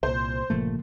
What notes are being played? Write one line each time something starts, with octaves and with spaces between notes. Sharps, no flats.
C2 A#2 C5
G1 A#2 C#3 F3 A3 A#3